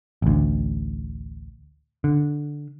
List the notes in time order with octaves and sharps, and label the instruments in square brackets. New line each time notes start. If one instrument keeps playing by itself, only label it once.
[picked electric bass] A1 D2
D3